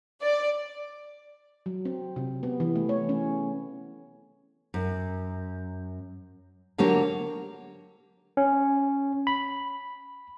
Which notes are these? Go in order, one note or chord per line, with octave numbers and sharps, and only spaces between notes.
D5
F#3
C4
C3
B3
E3
A3
C#5
C#4
F#2
D3 F#3 A#3 D4 G4 C#5
C#4
B5